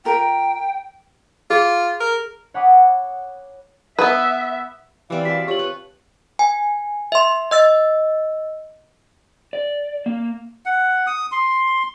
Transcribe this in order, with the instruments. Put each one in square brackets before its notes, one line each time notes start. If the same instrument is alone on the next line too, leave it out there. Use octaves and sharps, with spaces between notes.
[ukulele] F4 A#4 [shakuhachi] G5
[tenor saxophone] F4 [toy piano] G#4
[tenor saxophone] A#4
[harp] C#5 F#5 G#5 B5 D6 D#6
[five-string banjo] B3 B4 [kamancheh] E5
[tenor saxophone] E3 [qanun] G3 C4 [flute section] D5 F5
[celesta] F#4 B6 [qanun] E5 A5
[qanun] F4 [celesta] G4 F#7 [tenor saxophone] C#5
[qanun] B4
[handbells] G#5
E5 C6
D#5 E6 A6
[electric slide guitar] D5
A#3
[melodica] F#5
D#6
C6